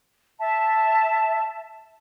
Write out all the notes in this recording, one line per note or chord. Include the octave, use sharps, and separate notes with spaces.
E5 A5